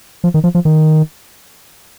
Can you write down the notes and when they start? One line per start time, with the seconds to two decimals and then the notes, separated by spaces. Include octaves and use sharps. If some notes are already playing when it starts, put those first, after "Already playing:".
0.24 F3
0.34 D#3
0.44 F3
0.55 F3
0.65 D#3